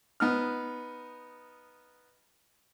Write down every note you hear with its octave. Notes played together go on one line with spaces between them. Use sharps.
B3 D#4 F6